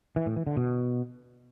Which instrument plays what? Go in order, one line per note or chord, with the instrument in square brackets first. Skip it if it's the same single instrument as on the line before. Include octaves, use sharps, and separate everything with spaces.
[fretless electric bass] E3
A2
E3
D3
B2